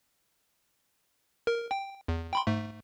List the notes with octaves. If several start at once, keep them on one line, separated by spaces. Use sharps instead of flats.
A#4
G5
E2
G5 B5 C6
G#2 A3